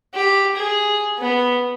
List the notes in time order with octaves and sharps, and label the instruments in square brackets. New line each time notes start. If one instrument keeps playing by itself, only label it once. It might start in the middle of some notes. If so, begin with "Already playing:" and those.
[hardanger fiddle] G4
G#4
B3